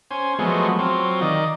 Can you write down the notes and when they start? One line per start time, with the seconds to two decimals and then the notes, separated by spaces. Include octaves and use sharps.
0.11 C#4 C5 G#5
0.39 F3 F#3 G#3 A3 B3
0.79 F#3 C4 F4
1.21 D#3 D5 D#5